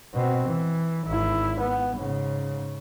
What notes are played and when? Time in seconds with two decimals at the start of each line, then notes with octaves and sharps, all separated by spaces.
0.14 B2 C4
0.47 E3
1.07 G#1 E4
1.59 B3
1.95 G#2 C#3